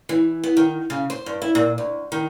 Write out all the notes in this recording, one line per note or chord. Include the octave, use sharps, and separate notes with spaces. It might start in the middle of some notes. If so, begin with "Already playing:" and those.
E3
B3
D#3
C#3
C5
G2
E4
A#2
D2
D#3